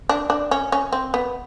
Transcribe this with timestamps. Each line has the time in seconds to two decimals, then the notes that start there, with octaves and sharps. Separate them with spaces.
0.09 D4
0.30 D4
0.51 C#4
0.72 C#4
0.93 C4
1.14 B3